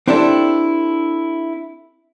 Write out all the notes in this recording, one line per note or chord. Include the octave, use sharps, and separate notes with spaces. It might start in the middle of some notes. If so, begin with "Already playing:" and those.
C4 D4 E4 G4 A4